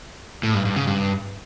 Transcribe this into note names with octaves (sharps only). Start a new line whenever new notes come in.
A2
G2
G2
C#3
G2